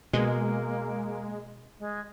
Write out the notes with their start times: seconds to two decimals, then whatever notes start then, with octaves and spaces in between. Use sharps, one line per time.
0.13 B2 G#3 A#3
1.79 G#3